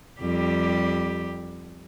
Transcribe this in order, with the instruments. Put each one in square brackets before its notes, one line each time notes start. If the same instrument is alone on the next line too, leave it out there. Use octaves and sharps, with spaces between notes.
[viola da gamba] F2 G3 G4